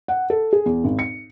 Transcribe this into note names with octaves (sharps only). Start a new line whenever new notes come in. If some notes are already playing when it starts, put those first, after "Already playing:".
F#5
A4
G#4
E2
G#1
C#7